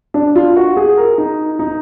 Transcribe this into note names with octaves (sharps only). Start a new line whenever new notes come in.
D4
F4
F#4
G#4
A#4
D#4
D#4